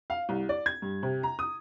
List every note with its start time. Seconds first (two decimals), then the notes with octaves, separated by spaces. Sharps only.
0.10 F5
0.29 C2
0.49 D5
0.66 G#6
0.82 G2
1.03 C3
1.23 A#5
1.39 D#6